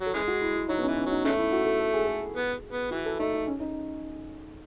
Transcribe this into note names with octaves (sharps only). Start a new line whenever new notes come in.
F#3 A4
C#3 E3 G#3 G#4
F#4
E4
E4
F#3 D#4
B3
C#4
E3
C#4
F#3
D#4
C#3 F#3 A3 C#4
E4
F#4
A4
A4
G#4
A4
B3
B3
E3 F#4
A4
A3 D#4
D#4
C#4
D#4